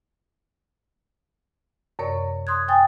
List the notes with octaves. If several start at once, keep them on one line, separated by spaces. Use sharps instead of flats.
F#2 C3 A#4 C#5 D5 C#6
C6 D#6 F#6 G#6
G5 G#5 D#6 A6